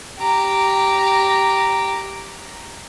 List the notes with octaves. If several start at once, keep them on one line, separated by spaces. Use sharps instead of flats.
G4 A#5